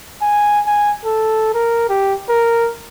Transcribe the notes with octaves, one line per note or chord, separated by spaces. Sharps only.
G#5
G#5
A4
A#4
G4
A#4